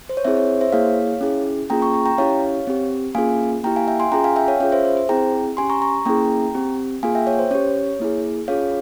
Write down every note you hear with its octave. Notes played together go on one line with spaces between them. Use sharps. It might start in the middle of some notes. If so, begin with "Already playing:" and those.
C5
C#5
C4 E4 G#4 C5 E5
C#5
C5 E5
A#3 E4 G#4 C#5 F5
C#4 E4 G#4
A#3 C#4 F4 G#4 G5 A#5
A#5 C#6
A#5 C#6
G5 A#5
C#4 E4 G4 C#5 F5
C4 G4
A#3 C#4 F4 G#4 F5 G#5
A#3 E4 G4 G5 A#5
F5 G#5
E5 G5
G#5 C6
C#4 F4 G#4 G5 A#5
F5 G#5
E5 G5
C#5 F5
C#4 F4 G#4 C#5 F5
C5 E5
C5
C5
C4 E4 G#4 G5 A#5
C#4 G4 G#5 C6
A#5 C#6
A#5 C#6
A#3 C#4 E4 G#4 G5 A#5
C4 G4
A#3 F4 G#4 F5 G#5
E5 G5
C#5
C5
C#4 G4 C#5
A#3 E4 G#4
C#4 F4 G#4 C#5 F5